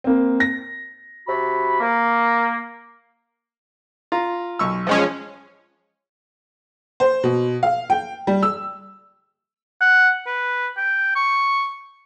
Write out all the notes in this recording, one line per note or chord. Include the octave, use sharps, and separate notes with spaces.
A#3 C4
A#6
C3 F#4 B5
A#3
F4 A#5
B1 C#6 E6
F3 G#3 C#4
C5
B2
F5
G5
G3
E6
F#5
B4
G5
C#6